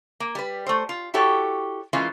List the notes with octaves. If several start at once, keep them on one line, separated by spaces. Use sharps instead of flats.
A#3
G3 B4
A3 C5
F4
E4 F#4 G4 A4 C#5
E3 G#3 A#3 C#4 F4